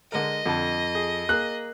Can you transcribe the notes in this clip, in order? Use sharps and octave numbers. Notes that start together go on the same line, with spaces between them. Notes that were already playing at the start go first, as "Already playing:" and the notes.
D3 G#3 A#4 D#5
F2 D3 A5
G#4
A#3 G#4 F#6